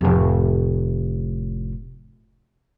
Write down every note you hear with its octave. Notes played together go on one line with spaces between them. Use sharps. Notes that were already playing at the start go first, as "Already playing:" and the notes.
F1 A2